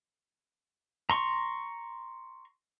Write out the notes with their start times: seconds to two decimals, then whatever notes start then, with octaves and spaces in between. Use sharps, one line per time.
1.10 A#5 C6 C#6